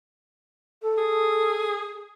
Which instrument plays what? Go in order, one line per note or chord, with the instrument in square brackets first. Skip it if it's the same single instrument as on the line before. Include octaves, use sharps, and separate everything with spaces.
[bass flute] A4
[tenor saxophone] G#4